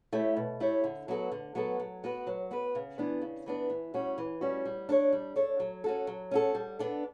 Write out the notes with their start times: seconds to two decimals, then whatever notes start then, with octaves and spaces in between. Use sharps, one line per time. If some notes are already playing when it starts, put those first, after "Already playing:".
0.13 A3 E4 G4 C#5
0.37 B2
0.60 A3 E4 G4 C#5
0.84 D3
1.08 F#3 B3 F#4 A4
1.32 D3
1.55 F#3 B3 F#4 A4
1.80 F#3
2.04 B3 F#4 B4
2.27 F#3
2.51 B3 F#4 B4
2.75 C#3
2.98 E3 B3 D4
3.21 C#3
3.46 E3 B3 D4
3.70 E3
3.94 G3 C#4 F#4
4.18 E3
4.41 G3 C#4 F#4
4.65 G3
4.89 D4 A4 C#5
5.13 G3
5.36 D4 A4 C#5
5.60 F#3
5.84 C#4 F#4 A4
6.07 F#3
6.31 C#4 F#4 A4
6.55 G3
6.79 B3 D4 A4